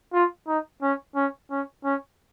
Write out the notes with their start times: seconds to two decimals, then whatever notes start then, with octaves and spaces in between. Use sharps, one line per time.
0.14 F4
0.48 D#4
0.82 C#4
1.16 C#4
1.51 C#4
1.84 C#4